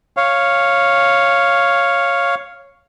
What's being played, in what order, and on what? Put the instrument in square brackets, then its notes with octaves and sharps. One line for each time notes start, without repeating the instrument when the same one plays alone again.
[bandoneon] C#5 F5